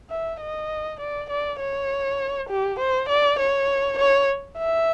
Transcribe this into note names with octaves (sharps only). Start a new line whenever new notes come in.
E5
D#5
D5
D5
C#5
G4
C5
D5
C#5
C#5
E5